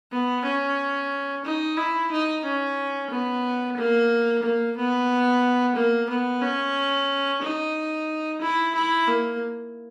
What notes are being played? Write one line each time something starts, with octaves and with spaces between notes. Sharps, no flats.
B3
C#4
D#4
E4
D#4
C#4
B3
A#3
A#3
B3
A#3
B3
C#4
D#4
E4
E4
A#3